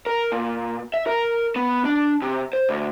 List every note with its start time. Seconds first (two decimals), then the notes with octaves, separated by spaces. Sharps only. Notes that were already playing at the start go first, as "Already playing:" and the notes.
0.06 A#4
0.32 A#2
0.94 E5
1.07 A#4
1.56 B3
1.85 D4
2.22 C3
2.53 C5
2.69 D2